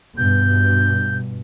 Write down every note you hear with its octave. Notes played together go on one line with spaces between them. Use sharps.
G2 B2 G6